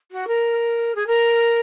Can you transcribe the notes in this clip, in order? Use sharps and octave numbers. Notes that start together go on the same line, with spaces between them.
F#4
A#4
G#4
A#4